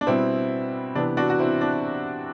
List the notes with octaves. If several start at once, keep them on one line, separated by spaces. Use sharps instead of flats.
D4
B2 G3 B3 C4 E4
C3 E3 B3 D4
D4 F#4
F#4
C4 E4
D4